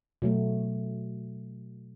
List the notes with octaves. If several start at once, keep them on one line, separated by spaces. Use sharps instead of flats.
B2 F#3 A3